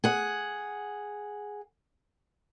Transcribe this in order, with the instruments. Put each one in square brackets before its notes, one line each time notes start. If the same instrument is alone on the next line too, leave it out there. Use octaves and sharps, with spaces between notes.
[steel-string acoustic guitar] G#4 F#5